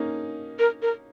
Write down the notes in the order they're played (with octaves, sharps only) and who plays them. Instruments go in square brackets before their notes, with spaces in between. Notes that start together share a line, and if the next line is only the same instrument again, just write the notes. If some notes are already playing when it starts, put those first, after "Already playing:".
Already playing: [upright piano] A#3 C#4 D#4
[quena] A#4
A#4